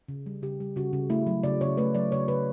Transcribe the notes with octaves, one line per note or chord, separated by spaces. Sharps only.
C#3
G3
C#3 G4
G3
C#3 F#4
C#3
A3 E4
F#3
C#3 D5
C#3 C#5
A3 B4
F#3 D5
C#3 C#5
C#3 B4